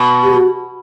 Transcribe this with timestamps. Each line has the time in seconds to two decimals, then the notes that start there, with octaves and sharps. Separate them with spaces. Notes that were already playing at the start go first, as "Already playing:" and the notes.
Already playing: B2
0.24 G4
0.35 F#4